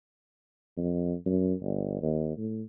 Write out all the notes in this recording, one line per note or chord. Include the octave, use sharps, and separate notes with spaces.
F2
F#2
G1
D#2
A2